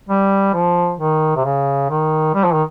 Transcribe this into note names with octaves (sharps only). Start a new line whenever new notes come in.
G3
F3
D#3
C3
C#3
D#3
G3
F3
D#3